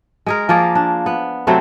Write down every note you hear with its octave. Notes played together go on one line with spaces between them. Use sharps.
G#3 G#4 A#4
F3 A#3 G#4 D5
D4
B3
C3 F#3 A3 C4